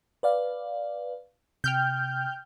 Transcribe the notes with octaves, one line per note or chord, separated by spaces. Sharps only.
B4 D5 F5
C3 G5 F6 G6